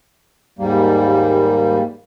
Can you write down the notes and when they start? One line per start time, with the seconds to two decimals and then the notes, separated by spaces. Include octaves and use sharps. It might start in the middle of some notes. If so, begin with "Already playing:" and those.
0.59 D#2 G#2 G3 A#3